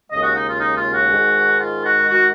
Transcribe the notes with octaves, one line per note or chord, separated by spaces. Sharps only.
D#2 C#3 G#3 D#5
F#4
D#4
F4
D#4
F4
F#4
G#2 D#3 G#3
F4
F#4
D#3 G#3 F#4